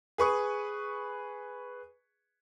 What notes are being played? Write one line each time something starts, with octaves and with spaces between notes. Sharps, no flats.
G#4 B4 C#6 D#6